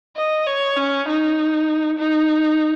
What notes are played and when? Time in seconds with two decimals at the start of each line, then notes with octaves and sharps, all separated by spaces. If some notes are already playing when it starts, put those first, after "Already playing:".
0.16 D#5
0.46 C#5
0.77 C#4
1.08 D#4
1.98 D#4